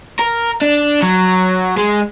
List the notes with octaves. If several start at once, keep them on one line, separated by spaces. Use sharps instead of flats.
A#4
D4
F#3
G#3